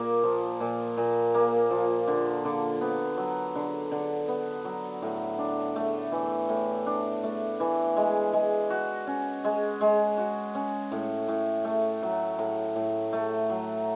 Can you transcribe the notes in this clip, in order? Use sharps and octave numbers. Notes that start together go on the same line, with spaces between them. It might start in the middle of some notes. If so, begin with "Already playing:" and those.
Already playing: A#2 A#3
F3
A#2
A#2
A#3
F3
D3
D3
B3
F#3
D3
D3
B3
F#3
A2
D4
A3
E3
A2
D4
A3
E3
G#3
G#3
F#4
C#4
G#3
G#3
F#4
C#4
A2
A2
A3
F#3
A2
A2
A3
F#3